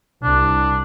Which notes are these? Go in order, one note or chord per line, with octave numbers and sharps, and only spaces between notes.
C2 D4